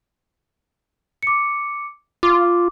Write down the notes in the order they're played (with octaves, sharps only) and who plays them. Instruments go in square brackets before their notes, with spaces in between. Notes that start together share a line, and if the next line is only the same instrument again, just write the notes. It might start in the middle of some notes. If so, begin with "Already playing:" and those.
[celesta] D6 C#7
[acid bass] F4 [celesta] D6